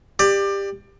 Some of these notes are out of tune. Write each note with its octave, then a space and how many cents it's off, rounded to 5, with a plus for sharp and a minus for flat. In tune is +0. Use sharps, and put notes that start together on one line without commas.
G4 +15 D5 +25